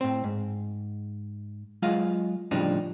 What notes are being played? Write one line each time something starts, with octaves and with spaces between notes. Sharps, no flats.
A2 C4
G#2
F#3 G#3 F4 D#5 F5
A2 C#3 F3 G3 D4 D#4